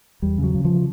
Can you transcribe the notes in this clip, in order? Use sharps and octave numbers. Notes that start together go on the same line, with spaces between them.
E2 G3
C#3
F#3
C#3
F3